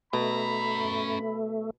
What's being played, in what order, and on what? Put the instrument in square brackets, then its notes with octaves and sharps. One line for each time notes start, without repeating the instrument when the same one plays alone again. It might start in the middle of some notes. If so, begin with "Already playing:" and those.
[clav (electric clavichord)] B2 [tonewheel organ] A3 [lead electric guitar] C#4 A#5 [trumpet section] B5